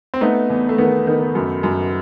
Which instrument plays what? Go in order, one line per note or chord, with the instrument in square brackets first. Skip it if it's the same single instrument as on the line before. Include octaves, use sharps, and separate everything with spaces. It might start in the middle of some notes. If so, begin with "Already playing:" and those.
[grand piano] C4
[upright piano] A3 [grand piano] B3 D#4
[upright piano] E2
[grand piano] A3
[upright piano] D#3 [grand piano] B3
[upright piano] D#3
F#2
F#2